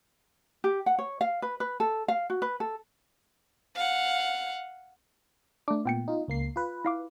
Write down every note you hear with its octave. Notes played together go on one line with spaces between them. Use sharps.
G4
F#5
C#5
F5
B4
B4
A4
F5
F#4
B4
A4
F5 F#5
A3 D4 D6
A#2 B3 G5 C#7
D#4 F4
C#2 A#3 C7
F4 B4
E4 F5 D6